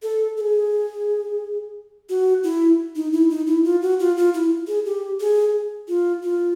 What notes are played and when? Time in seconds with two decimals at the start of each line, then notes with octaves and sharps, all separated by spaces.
0.03 A4
0.37 A4
0.41 G#4
2.09 F#4
2.44 E4
2.96 D#4
3.13 E4
3.30 D#4
3.47 E4
3.64 F4
3.82 F#4
4.00 F4
4.17 F4
4.34 E4
4.68 G#4
4.86 G4
5.20 G#4
5.88 F4
6.23 F4